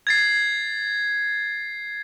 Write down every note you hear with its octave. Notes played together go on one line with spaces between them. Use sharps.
G#6 A6 C7